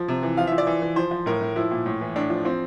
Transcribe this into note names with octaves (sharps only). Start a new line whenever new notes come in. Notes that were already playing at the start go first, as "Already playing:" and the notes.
Already playing: F3
C3
E3
F3 F5
E5
F3
D5
E3
E3
F3 C5
F3
A2 A#4
A2
F3 E4
A#2
A2
E3
A2 D4
F3
F3 C4